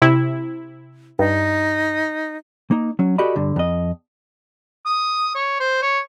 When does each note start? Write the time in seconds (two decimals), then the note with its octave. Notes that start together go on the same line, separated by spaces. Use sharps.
0.02 C3 E4
1.19 G2 D#4
2.71 A#3 D#4
2.99 F#3 C#4
3.18 F#4 G4 A4 D5 D#5 B5
3.36 G2 D3
3.56 F2 D#5
4.86 D#6
5.35 C#5
5.60 C5
5.82 C#5